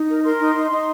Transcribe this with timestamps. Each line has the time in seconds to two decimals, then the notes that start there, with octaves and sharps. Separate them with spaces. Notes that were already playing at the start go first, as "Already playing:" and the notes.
Already playing: D#4
0.09 A#4
0.24 A#4 C6
0.39 D#4
0.55 D#4
0.71 D#4